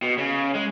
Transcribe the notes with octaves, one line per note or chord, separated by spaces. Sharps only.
B2
C#3
G#3